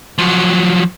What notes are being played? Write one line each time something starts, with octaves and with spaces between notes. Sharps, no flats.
F3 F#3